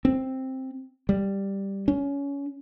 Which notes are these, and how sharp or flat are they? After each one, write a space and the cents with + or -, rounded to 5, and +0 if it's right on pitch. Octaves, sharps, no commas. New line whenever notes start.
C4 +5
G3 +5
C#4 +20